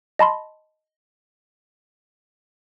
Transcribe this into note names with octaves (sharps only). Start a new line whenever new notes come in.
D#5 A5 B5 C6